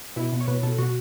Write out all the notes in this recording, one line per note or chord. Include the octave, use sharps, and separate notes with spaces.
B2 E4
B2
C#5
B2 B4
B2 A4
B2 F#4